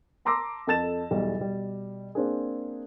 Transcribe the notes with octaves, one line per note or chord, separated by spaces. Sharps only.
A5 A#5 C6 D6 E6 A#6
F2 A4 A5 A6 E7
B1 E2 G3
B2 G3
A#3 C4 D4 G#4